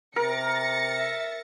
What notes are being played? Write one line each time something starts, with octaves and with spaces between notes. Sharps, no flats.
C3 A#4 A6 A#6 C#7
E5